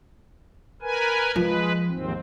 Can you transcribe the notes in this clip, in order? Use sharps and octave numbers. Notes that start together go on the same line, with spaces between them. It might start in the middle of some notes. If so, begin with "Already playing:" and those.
A#4 B4 G#5
F3 G#3 B4
D#2 G#2 C4